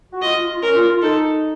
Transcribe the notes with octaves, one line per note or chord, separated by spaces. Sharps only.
F#4
F4 D#5
F4
F4
C#4 A#4
F4
F4
D#4 A4